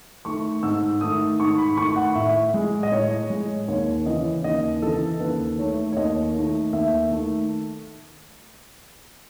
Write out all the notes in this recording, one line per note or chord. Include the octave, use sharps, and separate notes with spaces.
D#3 A3 C#6
G#2 E6
D#3 A3 D#6
G#2 C#6
B5
D#3 A3 C#6
F#5
A2 E5
G#3
D#5
A2 C#5
G#3
D#2 C#5
C#3 E3 D#5
D#2 D#5
C#3 E3 A4
D#2 B4
D#3 A3 C#5
C#5
D#2 D#5
D#3 A3
D#2 E5
D#3 A3